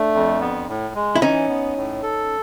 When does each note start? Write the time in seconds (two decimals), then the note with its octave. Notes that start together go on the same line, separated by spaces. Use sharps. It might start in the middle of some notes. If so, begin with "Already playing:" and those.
Already playing: A3 D4
0.15 F2
0.41 B3
0.69 A2
0.95 G#3
1.16 E4
1.22 E3 C#4 D#4
1.49 B3
1.76 A2
2.03 A4